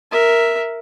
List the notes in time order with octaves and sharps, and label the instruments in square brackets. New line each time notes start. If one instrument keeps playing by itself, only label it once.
[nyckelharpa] A#4 E5